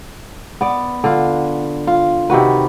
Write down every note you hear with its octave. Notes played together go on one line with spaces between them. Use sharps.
B3 D5
D3 F4
F4
C3 D#3 F#4 B4